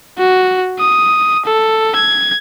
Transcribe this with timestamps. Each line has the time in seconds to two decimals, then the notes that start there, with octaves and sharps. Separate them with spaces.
0.18 F#4
0.79 D#6
1.45 A4
1.96 G#6